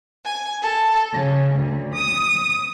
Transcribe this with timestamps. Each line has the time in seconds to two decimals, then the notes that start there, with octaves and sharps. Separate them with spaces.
0.23 G#5
0.61 A4
1.11 C#3
1.53 D2
1.93 D#6